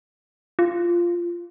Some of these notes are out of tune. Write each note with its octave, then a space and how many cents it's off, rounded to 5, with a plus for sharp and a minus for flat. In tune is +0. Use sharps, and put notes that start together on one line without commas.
F4 -10